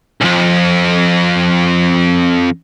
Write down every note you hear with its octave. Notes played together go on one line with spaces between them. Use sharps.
B1 F2